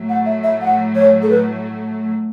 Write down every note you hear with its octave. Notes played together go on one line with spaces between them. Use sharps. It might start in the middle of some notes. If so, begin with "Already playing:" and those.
Already playing: A2 F#3 A3
F#5
E5
E5
F#5
C#5
A4
B4